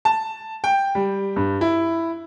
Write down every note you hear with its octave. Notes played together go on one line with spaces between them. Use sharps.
A5
G5
G3
G2
E4